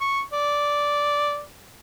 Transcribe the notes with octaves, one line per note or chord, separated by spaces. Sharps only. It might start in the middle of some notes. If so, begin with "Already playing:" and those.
C#6
D5